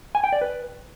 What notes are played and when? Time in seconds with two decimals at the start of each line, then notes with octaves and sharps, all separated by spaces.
0.15 G#5
0.24 G5
0.33 D5
0.41 B4